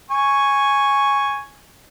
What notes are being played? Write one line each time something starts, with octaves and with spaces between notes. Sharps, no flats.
G#5 C#6